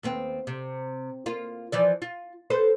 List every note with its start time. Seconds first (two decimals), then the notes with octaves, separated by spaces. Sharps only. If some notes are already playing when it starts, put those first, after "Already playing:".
0.03 D#2 B3 C4
0.47 C3
1.26 A#3 F4
1.72 E3 F3 D5
2.02 F4
2.50 A4 B4 C5